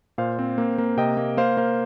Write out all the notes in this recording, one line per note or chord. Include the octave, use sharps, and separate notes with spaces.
A#2 C5 F5
C4
A#3
A#3
C3 D#5 G5
A#3
A#3 C5 F5
A#3 C5 F5